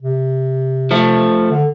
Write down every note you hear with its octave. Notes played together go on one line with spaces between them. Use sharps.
C3
F3 A3
D3